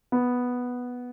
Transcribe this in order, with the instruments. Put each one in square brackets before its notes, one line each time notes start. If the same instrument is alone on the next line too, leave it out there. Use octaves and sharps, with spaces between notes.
[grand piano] B3